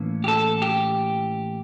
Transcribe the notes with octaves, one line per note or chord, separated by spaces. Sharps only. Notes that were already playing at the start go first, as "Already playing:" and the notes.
Already playing: A2 E3 A#3 C#4
G4
A4
G4